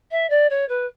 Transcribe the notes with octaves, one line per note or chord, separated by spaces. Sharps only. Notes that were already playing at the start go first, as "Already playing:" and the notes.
E5
D5
C#5
B4